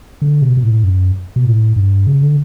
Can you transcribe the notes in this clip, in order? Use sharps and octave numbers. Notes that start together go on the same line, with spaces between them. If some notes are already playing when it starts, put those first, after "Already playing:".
D3
B2
B2
A2
F#2
B2
A2
G2
C#3
D3